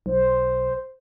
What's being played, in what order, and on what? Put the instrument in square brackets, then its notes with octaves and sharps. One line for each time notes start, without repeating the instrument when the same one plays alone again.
[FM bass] B1 [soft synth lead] C5